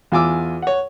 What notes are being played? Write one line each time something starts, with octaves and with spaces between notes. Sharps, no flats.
E2 F4 G#5 D6 E6
C#5 F#5